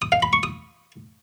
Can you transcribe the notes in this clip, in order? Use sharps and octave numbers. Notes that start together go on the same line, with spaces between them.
D#6
F5
B5
C#6
D#6